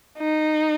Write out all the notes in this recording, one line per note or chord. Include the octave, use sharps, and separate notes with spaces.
D#4